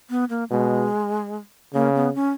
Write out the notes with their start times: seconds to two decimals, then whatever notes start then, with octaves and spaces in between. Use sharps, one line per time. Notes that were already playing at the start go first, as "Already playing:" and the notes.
0.10 B3
0.30 A#3
0.50 B2 G#3
1.74 C#3 A#3
1.95 B3
2.15 C#4